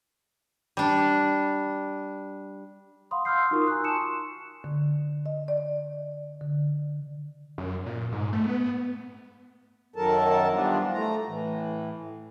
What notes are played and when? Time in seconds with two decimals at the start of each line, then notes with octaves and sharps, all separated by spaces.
0.77 G3 D4
3.11 F5 F#5 B5 C6 D#6
3.25 C6 D6 E6 F6 G6 C7
3.51 D#4 F4 F#4 A#4 C#6 D#6
3.67 G#5 A#5 C6 C#6 E6 F#6
3.83 A5 C6 C#7 E7
4.64 D3
5.26 D#5
5.48 D5
6.41 D3
7.58 F#2
7.86 A#2
8.12 G#2
8.33 A3
8.46 B3
8.59 B3
9.96 F#2 D#3 F#3 A4 A#4 A5
10.52 E3 F3 G3 B3 D4 F4
10.93 A3 A#5
11.27 A2 E3